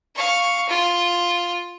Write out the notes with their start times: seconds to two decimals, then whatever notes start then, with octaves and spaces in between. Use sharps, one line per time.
0.15 F5 C#6
0.69 F4